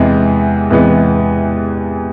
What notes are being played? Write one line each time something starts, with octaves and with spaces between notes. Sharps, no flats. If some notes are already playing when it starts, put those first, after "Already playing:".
Already playing: E2 C3 E3 G#3 B3
E2 C3 E3 G#3 B3